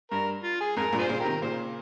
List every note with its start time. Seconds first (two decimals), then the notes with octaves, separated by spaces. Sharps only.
0.11 G2 A#4
0.44 F4
0.60 G#4
0.76 F2 G#2 A#4
0.93 G2 A#2
0.98 F4 G#4 C5
1.09 A#2 C#3
1.20 G4 A#4
1.25 C3 D#3
1.42 A#2 C#3 C5